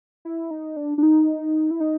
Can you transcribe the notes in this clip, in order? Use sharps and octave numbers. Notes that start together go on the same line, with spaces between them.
E4
D#4
D4
D4
D#4
E4
D#4